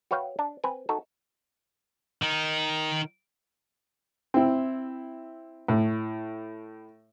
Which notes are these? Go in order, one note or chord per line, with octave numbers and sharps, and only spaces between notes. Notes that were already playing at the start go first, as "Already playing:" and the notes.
F#4 B4 C#5 F5 G5
D4
C4 B4 G#5
D#4 F#4 A4
D#3 D#4
C4 E4
A2